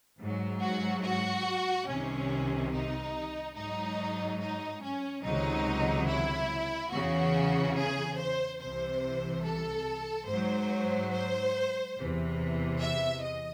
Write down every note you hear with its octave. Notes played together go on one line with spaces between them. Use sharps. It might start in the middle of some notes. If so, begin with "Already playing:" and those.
G#2 F#3
F#4
F#4
C2 C3 D#3 C#4
D#4
G#2 F#3 D#4
D#4
C#4
C#2 C3 D#3 F#3 D#4
E4
E2 C#3 E3 F#4
G#4
C5
C2 C3 E3 C5
A4
G#2 F#3 C5
C5
E2 C3 E3
E5
D#5